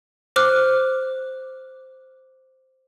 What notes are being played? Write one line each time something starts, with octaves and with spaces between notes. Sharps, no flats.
C5 D6 F6 F#6